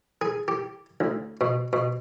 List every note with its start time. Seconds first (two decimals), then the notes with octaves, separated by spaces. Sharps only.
0.21 G#4
0.48 G4
1.00 D2
1.41 B2
1.73 B2